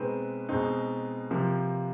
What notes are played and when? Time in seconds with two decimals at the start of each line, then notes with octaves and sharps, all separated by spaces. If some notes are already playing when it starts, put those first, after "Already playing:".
Already playing: B2 G#3 C4 D#4 B4
0.49 B2 G#3 C4 D#4
1.31 C3 F3 A#3